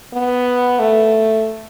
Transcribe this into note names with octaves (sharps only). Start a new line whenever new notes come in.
B3
A3